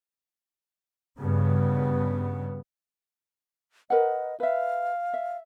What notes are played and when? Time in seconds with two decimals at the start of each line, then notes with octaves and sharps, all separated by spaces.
1.18 G2 C#3 B3
3.90 A#4 B4 D#5 F#5
4.40 B4 E5 F5
5.14 E5